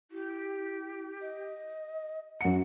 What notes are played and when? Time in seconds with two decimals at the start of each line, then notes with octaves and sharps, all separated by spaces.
0.11 E4 G4
1.22 D#5
2.41 F#2 F#5 C#7